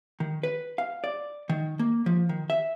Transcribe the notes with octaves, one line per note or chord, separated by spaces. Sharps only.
D#3
B4
F5
D5
D#3
A#3
F3
D#3
E5